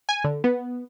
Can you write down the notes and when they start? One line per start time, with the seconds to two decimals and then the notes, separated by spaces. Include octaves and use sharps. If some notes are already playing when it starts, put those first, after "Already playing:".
0.09 G#5
0.24 D3
0.44 B3